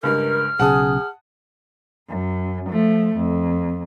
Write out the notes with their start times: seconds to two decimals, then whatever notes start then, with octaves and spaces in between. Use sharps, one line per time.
0.03 C#2 G2 A#4 F6
0.59 B1 C#3 G#4 F#5 A5 D#6
2.08 F#2
2.70 F3 A3
3.17 F2